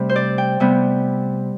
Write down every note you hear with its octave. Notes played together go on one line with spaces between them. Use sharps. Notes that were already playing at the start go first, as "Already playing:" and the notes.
Already playing: C3 G3 A3 C4
C5
D5
G5
C3 G3 B3